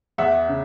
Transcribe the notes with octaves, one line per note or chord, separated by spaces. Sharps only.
E2 E5 F#5
C#3